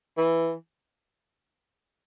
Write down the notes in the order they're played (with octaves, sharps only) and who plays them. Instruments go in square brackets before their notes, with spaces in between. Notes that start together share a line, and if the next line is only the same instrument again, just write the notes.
[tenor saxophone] E3